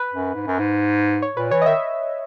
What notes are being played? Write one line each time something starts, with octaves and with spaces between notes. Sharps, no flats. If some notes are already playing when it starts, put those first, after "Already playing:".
Already playing: B4
F#2
G#2
F#2
G#2
C#5
A#2 B4
E3 C#5
D#5
D#3 E5